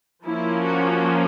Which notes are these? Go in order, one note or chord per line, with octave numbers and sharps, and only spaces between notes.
F3 A#3 C#4 E4
F#4